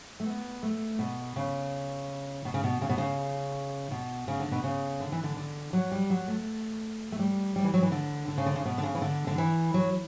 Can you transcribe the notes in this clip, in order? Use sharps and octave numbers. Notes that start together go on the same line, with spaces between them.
A3
B3
A3
B2
C#3
B2
C#3
B2
C#3
B2
C#3
B2
C#3
D3
B2
C#3
D3
E3
D3
D3
F#3
G3
F#3
A3
A3
G3
G3
E3
F#3
E3
D3
D3
C#3
D3
C#3
B2
D3
C#3
E3
D3
D3
E3
F#3